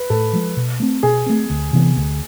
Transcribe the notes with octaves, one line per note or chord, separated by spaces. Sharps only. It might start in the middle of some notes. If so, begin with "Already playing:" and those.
Already playing: B4
A2 A4
F3 G#3
B2
A3 C4
B2 G#4
A3 C4
D2
C3 E3 B3
D2